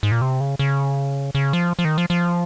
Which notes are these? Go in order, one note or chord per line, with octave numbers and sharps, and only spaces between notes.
G#2
A#2
C3
C#3
C#3
C#3
F3
F3
D#3
F3
F3